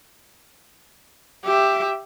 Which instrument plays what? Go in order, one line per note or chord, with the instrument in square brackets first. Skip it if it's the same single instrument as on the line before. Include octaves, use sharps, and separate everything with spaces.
[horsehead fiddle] G4 E5